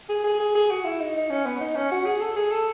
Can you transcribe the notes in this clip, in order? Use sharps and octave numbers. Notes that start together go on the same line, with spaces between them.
G#4
G#4
G#4
G#4
F#4
E4
D#4
D#4
C#4
B3
D#4
C#4
F#4
G#4
A4
G#4
A4